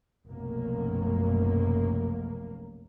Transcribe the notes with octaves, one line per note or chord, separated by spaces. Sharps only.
F1 B1 F#2 B2 A#3